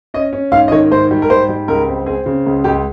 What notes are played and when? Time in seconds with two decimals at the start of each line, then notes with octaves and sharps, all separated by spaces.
0.14 C#4 D#5
0.33 C#4
0.52 G#2 F5
0.68 D#5
0.71 D#3 C#5
0.91 G#2 C5
1.11 G3
1.22 A#4
1.30 G#2 C5
1.49 G3
1.68 C#2 A#4
1.88 C4
2.06 C4 G#4
2.26 C#3
2.46 C#2
2.64 C#2 G4